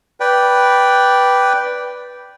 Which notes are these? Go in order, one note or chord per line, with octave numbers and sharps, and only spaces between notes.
B4 D5 G5